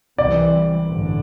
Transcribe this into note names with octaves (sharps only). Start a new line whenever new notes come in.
C2 C3 E3 G3 C4 D5
A1 G2 D3